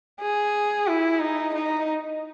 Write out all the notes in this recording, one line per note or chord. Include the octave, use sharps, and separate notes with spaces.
G#4
E4
D#4
D#4